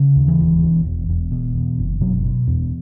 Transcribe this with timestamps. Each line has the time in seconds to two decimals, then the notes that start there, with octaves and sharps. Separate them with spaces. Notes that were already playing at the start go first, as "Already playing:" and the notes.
Already playing: C#3
0.16 D#2
0.28 E3
0.39 E1
0.62 E1
0.85 E1
1.09 E1
1.31 B2
1.54 E2
1.79 F#1
2.01 B2 F#3
2.25 B2
2.47 E2